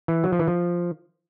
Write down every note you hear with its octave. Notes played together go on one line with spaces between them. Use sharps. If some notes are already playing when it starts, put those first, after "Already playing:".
E3
F#3
F3
E3
F3